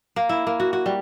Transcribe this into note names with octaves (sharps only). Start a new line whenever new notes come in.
A#3
E4
A#3
F#4
F#4
G3